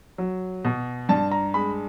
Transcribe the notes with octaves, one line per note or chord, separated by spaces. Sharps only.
F#3
B2
G2 A5
A#5
G#3 B5